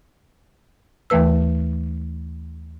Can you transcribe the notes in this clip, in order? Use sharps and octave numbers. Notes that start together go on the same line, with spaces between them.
D#2 E3 A3 B4 E6